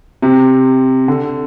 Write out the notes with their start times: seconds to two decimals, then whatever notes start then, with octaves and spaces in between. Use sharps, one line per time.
0.22 C3
1.08 D3